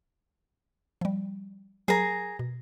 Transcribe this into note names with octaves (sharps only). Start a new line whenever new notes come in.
F3 G3
F#3 G#4 A#4 A#5
B2